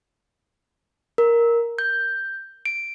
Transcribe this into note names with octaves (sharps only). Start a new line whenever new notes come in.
A#4
G6
D7